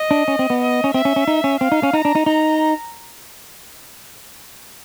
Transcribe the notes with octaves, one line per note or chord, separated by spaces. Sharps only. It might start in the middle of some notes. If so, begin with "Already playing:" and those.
Already playing: D#5
D4
C#4
C4
B3
D#5
C#4
C4 E5
C#4
C#4
D#4
C#4
C4 F5
D#4
C#4
D#4 A#5
D4
D#4
D#4 A#5